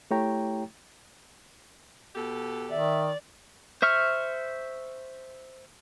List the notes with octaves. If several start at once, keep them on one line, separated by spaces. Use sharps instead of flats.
A3 E4 G4 C#5 G5 A#5
B2 G4 A4
D#3 D5 E5
C5 E5 C#6 F6